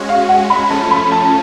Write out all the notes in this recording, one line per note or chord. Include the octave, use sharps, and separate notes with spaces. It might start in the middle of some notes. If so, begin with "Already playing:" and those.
Already playing: G#3 C#4 F#4
F5
F#5
B5
F3 A3 C#4 A5
B5
A5
A5